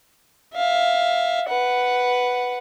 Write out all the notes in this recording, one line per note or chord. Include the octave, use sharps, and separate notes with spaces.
E5 F5
B4 F#5